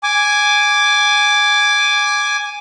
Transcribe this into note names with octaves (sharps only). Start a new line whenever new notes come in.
G#5 D6